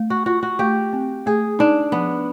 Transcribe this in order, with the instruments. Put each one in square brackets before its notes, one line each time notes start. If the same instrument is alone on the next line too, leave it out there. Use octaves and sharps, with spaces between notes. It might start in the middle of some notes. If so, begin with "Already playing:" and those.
Already playing: [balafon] A3
[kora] F#4
[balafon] F4 [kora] F#4
[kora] F#4
[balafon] A3 [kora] G4
[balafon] C4
[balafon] A3 [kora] G#4
[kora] D4 [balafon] D#4
[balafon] F3 [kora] B3